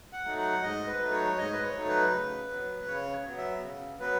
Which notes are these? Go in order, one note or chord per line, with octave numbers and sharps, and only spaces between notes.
F#5
F#3 A3 D#4
F#5
G#2 D#5
B4
F#3 A3 D#4
C#5
G#2 D#5
B4
C#5
F#3 A3 D#4
B4
C#3
F#3 B3
C#3 C#5
F#3 B3
E5
C#3
F#3 B3 B4